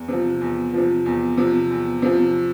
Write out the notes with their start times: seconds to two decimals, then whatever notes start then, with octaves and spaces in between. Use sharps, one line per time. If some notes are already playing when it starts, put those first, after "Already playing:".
Already playing: E2
0.08 C3 F3
0.41 E2
0.74 C3 F3
1.06 E2
1.37 C3 F3
1.70 E2
2.02 C3 F3